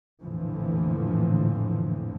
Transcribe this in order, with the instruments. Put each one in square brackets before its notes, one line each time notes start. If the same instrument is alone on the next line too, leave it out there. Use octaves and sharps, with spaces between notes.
[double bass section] A#1 F2 A2 D3 E3 F3